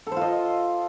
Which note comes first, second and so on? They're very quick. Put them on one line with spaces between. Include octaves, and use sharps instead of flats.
A4 C5 F4 D#5